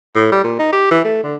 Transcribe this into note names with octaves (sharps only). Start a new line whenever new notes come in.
A2
G3
A#2
D#4
G4
E3
A3
D3